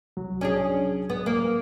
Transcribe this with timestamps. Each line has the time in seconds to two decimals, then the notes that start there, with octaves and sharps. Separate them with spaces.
0.17 C2 F#3
0.41 C#4 D4 G#4
1.10 B3
1.26 A#3